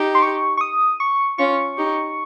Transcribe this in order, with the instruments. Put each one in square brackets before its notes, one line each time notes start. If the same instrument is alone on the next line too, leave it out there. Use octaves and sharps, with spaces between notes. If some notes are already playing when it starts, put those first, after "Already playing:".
Already playing: [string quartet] D#4 G4
[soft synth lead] C6
C#6
C#6
D#6
C#6
[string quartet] C#4 F4 [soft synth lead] C#6
[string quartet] D#4 G4